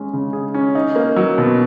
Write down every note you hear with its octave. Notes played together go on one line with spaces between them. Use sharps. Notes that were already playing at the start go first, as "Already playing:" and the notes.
Already playing: G#3 C#4
C#3
G#4
C#4
D#4
A#3
F#3
B2